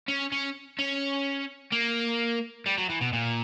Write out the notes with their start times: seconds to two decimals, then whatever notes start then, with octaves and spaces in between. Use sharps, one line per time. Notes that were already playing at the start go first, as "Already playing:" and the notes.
0.08 C#4
0.32 C#4
0.79 C#4
1.72 A#3
2.66 G3
2.78 F#3
2.90 E3
3.01 B2
3.13 A#2